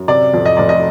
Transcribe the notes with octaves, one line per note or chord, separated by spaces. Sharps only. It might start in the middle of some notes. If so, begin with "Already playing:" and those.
Already playing: F#2
C3 D5
F2
D#5
F1 D5
D#5